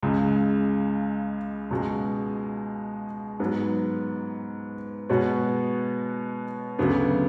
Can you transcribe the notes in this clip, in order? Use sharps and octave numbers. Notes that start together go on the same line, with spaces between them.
C#2 C#3 G#3
C#2 B2 G#3
G#2 F#3 B3
B2 G#3 B3 F#4 C#5
D2 C#3 F#3 B3 D4